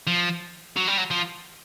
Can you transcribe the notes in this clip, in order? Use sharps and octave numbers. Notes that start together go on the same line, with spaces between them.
F3
F#3
G3
F#3
F3